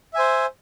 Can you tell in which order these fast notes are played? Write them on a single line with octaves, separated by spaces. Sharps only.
E5 G#5 C5